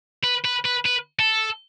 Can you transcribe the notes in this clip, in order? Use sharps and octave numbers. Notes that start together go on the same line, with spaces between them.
B4
B4
B4
B4
A4